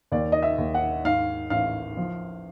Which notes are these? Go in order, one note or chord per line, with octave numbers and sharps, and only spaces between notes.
D#2 D5
D#5
E5
D#2
F#5
G#2 F5
A1 F5
F3